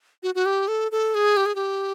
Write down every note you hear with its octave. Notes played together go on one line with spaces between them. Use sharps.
F#4
F#4
G4
A4
A4
G#4
G4
G#4
G4